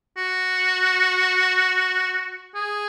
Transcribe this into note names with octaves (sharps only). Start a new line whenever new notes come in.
F#4
G#4